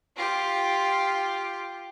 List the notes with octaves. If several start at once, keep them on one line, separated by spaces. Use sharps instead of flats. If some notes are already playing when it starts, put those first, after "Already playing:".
F4 G4